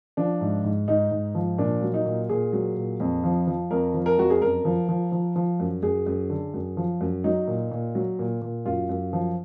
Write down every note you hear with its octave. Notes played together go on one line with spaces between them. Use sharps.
F3 D4
G#2
G#2
G#2 D#4
G#2
F3
A#2 D4
F#3
D#4
A#2
A#2 G#4
F#3
A#2
F2
F3
F3
F2 A#4
F3
A#4
F2 F#4
G#4
F#2 A#4
F3
F3
F3
F3
F#2
F#2 G#4
F#2
D3
F#2
F3
F#2
F#3 D#4
A#2
A#2
F#3
A#2
A#2
F#2 F4
F#2
F3